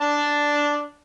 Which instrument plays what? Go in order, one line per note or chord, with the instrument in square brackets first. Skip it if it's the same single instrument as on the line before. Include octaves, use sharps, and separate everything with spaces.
[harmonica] D4 A5